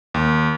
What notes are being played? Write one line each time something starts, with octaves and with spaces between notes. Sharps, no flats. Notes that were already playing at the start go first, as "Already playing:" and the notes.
D#2